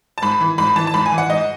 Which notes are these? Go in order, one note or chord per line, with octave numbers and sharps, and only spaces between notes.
A5
G#2 B5
E3
G#2 B5
E3 A5
A5
G#2 B5
G#5
E3
F#5
G#2 D#5